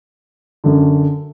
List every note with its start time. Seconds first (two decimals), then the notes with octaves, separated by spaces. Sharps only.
0.64 F#2 D3